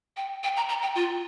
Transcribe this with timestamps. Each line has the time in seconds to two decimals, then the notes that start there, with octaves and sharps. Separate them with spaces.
0.17 G5
0.44 G5
0.57 A#5
0.69 A#5
0.82 G5
0.95 F4